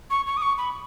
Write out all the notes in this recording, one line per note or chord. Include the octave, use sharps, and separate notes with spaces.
C#6
C#6
D#6
C#6
B5